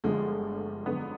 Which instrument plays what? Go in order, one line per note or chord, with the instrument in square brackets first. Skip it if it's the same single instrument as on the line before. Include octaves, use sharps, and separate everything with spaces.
[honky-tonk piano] G1 G2 D3 F3 A3 [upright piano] G#3
[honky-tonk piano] F2 D3 F#3 B3